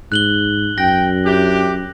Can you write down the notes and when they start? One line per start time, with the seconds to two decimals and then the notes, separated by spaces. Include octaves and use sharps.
0.12 G#2 F#6 F#7 G7
0.78 F#2 G5 A#6
1.25 D4 E4 G4